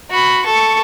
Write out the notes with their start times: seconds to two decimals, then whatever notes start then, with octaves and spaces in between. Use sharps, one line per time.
0.10 F#4 B5
0.45 A4 C#6